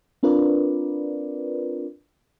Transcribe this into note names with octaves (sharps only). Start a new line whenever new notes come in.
C4 D4 F4 A#4 B4 D5